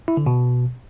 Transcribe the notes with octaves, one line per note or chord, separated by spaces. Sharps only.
E4
D3
B2